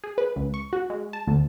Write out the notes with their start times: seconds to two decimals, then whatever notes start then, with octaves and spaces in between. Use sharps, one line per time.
0.04 G#4
0.18 B4
0.36 C#2
0.54 C#6
0.73 F#4
0.90 G#3
1.13 A5
1.27 D2